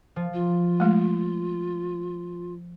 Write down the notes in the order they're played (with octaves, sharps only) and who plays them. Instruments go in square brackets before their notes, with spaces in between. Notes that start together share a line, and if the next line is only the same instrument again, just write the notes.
[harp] F3
[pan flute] F4
[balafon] G#3 A3